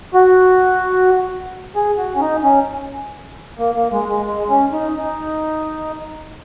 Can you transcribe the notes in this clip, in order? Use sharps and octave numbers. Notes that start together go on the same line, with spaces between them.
F#4
G#4
F#4
C#4
D#4
C#4
A#3
A#3
G#3
G#3
G#3
C#4
D#4
D#4